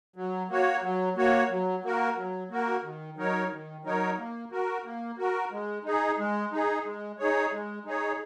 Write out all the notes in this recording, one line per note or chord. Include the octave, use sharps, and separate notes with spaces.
F#3
A#3 F#4 C#5
F#3
A#3 F#4 C#5
F#3
A#3 F#4 A#4
F#3
A#3 F#4 A#4
D#3
F#3 D#4 A#4 C#5
D#3
F#3 D#4 A#4 C#5
A#3
F#4 A#4
A#3
F#4 A#4
G#3
D#4 G#4
G#3
D#4 G#4
G#3
D#4 G#4 C#5
G#3
D#4 G#4 C#5